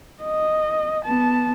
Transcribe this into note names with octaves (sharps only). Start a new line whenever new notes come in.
D#5
B3 A5